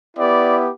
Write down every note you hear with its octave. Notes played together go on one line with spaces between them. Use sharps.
B3 E4 G4 D5